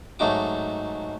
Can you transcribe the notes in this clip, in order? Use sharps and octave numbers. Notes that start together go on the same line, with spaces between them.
G#2 F#3 A3 D#4 F#4 D6